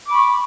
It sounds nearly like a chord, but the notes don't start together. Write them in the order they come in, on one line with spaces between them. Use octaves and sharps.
D6 B5 C#6